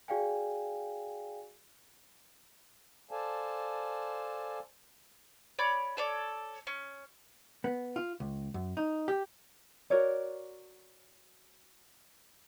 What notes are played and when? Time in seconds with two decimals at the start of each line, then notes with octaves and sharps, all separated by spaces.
0.08 F#4 G#4 D5 F5 G5 G#5
3.11 A4 C5 D5 F5 G#5 A5
5.59 C#5 D5 B5
5.97 A4 C#5 D5
6.67 C#4
7.64 B3
7.96 F4
8.20 C#2
8.54 F#2
8.77 D#4
9.08 G4
9.90 F#4 A#4 C#5 D5